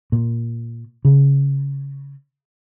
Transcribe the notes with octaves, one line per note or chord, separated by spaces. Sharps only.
A#2
C#3